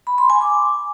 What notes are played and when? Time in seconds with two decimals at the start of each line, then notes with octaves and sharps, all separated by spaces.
0.07 B5
0.18 C6
0.30 G#5
0.41 D6